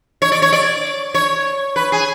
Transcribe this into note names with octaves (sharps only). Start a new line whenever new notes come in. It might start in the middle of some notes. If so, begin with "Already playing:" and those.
C#5
D5
C#5
D5
C#5
B4
G#4